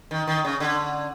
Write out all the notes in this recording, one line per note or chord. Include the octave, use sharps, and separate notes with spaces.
D#3
D#3
C#3
D3